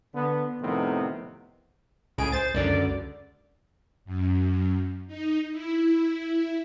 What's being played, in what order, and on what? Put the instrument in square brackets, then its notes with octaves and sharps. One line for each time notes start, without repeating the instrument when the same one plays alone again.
[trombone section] D3 B3
F2 A2 C3 D#3 B3
[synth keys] C#2 A2 D7 [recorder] G#4
[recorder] C5 [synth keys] A6
[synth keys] C#2 F#2 D3 [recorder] D5
[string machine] F#2
D#4
E4